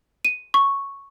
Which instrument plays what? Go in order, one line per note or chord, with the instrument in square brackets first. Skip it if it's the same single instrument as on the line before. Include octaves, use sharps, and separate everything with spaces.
[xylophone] D#7
C#6